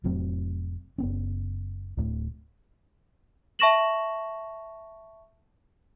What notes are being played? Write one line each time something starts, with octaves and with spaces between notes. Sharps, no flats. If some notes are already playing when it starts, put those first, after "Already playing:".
F1 A2 F#3 C4
F#1 B3 C#4
D1 A2
E5 A5 C#6 A#6 E7 F#7